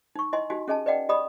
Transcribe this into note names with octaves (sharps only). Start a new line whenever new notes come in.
D#4 C#6
E4 D#5 G#5 C6
D#4 F#4 G4 G#5
C#4 G#4 D#5 G#5 A5
B4 D5 D#5 F#5 G5
G4 D5 D#5 B5 D#6